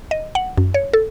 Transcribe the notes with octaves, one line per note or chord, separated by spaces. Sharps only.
D#5
F#5
F#2
C#5
A4